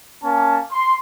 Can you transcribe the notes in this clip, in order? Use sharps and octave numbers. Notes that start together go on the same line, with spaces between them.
A#3 C#4 A5
C6